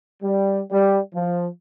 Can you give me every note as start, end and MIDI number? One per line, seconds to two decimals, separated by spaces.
0.22 0.61 55
0.71 0.97 55
1.14 1.47 53